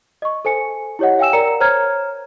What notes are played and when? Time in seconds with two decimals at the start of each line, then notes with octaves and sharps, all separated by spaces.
0.22 D#5 C#6
0.45 A4 C5 G#5 C#7
0.99 E4 G4 C#5 D#5 F#5
1.19 F5 G5 G#5 E6 E7
1.33 A#4 D5 A#5 C#7
1.60 C5 C#5 A#5 F6 G#6